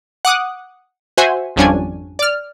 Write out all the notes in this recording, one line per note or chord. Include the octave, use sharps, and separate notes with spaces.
F#5 D6 D#6 F#6
F#4 C5 E5 F#5 G#5
G#1 F2 G3 C#4 D4 G#5
D5 F6